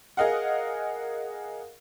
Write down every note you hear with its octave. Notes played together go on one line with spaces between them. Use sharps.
G#4 A#4 D#5 F5 F#5